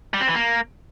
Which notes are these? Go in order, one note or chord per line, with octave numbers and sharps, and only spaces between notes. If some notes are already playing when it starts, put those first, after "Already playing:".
G3
C4
E3
A#3